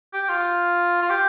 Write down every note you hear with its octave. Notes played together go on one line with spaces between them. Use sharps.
G4
F4
F4
G4